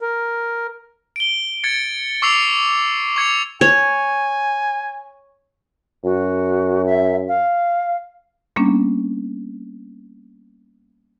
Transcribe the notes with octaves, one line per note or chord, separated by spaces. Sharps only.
A#4
D7 G7
G#6 A6 C#7
C#6 D6 E6 C7 C#7 F7
C#6 G#6 C#7 F7
C#5 G#5
F#2 F#4
E5
F5
G3 A#3 B3 C#4 D4